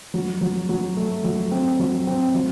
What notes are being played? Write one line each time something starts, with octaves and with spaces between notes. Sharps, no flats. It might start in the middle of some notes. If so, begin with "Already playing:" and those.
F#3
F#3
F#3
A3
F#3
C4
F#3
C4
F#3